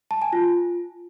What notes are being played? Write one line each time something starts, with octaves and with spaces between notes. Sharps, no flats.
A5
G#5
F4